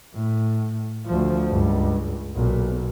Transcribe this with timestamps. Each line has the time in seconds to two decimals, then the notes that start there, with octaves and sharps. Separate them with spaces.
0.14 A2
1.07 D2 F3
1.49 C#2 G2
2.34 B1 A#2